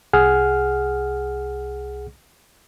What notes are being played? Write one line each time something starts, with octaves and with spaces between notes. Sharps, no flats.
C2 G#4 F#5 F6